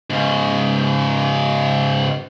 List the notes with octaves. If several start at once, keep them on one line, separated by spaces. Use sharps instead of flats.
G#2 C#3